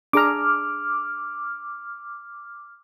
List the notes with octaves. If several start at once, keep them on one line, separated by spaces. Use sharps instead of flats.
D4 G#4 A#5 D6 F6